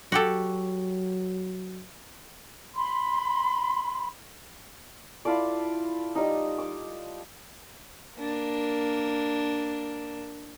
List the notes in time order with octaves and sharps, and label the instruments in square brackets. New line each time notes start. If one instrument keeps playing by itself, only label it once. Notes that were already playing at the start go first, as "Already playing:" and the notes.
[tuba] F#3 [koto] F#4 G4 A4
[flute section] B5 C6
[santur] E4 F4 A4 D5
G3 D#4
D6
[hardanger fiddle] A#3 D4